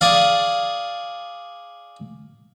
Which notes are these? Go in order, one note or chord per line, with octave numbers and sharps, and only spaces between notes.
G#4 D5 F5